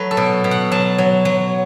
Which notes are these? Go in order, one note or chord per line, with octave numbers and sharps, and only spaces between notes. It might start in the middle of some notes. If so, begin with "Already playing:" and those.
Already playing: F#3 A3 B4
A4
B2
B2
F#5
F#3 A5
F#3
F#3